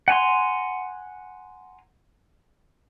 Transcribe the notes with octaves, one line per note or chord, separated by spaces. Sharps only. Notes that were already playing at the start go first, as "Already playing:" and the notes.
F#5 G#5 A#5 C6